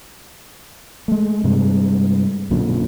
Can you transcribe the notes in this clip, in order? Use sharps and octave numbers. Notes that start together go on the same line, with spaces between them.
G#3 A3
G2 C3 G3 G#3
B1 F#2 A#2 D3